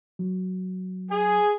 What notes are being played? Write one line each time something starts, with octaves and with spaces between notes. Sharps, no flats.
F#3
G#4